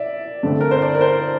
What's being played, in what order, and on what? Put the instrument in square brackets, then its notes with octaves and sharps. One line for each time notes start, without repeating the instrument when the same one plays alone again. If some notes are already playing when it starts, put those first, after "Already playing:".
Already playing: [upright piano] D5 E5
G2 D3 A3 C4
A#4
C5
D5
A#4
C5